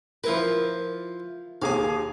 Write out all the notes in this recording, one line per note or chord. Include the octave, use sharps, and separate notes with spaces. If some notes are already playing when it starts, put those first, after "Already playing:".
F3 E4 F4 A#4 B4
D#2 G#4 F5 G#5 D6